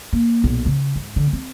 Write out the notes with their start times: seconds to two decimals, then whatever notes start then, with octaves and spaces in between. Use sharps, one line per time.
0.13 A#3
0.43 B1 A#2
0.66 C#3
0.96 G#2
1.16 D3
1.33 C4